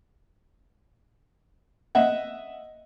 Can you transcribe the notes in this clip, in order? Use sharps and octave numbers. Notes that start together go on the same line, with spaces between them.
D#5 E5 F#5